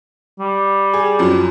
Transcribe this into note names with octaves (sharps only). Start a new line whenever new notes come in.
G3
G#4
F#2 F3